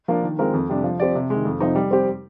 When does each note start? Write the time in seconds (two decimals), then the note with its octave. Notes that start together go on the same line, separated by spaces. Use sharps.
0.08 F3 A#3 D4
0.23 D#3
0.39 G#3 C4 F4 A#4
0.54 F2
0.69 C3 G3 D4
0.84 F3
1.00 C4 G4 D5
1.15 C3
1.30 D#3 G#3
1.45 F2
1.61 C3 F3 C4 D#4
1.75 G3
1.91 C4 G4 C5